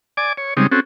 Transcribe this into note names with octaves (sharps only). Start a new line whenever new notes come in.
D5 G#5 D6
C#5
C#3 G3 G#3 C4 D#4
C4 C#4 F#4 A4